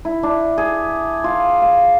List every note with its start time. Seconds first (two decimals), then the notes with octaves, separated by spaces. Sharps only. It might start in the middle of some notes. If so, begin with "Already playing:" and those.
0.05 E4
0.23 D4
0.58 G#4
1.24 F4
1.62 F5